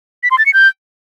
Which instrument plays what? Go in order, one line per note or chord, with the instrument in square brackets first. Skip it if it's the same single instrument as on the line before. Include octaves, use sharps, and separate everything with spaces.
[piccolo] B6
C6
A6
C#7
G6